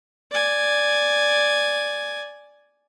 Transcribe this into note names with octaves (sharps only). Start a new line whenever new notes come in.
D5 G#5